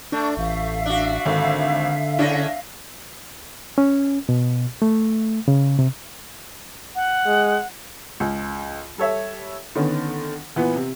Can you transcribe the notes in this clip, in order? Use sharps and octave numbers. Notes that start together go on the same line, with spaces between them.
A3 D4
A1 E5 F5
D4 F#4
G#1 D3
C#3 C#4 D4 E4 A#6
C#4
B2
A3
C#3
C3
F#5
G#3
C#2
G3 A4 C#5 E5
D3 D#3 B3 C#4
A#2 E3 B3 F#5
C3